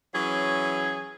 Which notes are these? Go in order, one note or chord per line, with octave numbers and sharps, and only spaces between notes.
E3 F#3 C#4 G#4